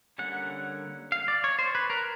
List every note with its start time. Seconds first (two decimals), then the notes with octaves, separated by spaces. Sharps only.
0.18 D3 G3 A#3 C#4 F#5
1.12 F5
1.28 D5
1.44 C#5
1.59 C5
1.75 B4
1.90 A#4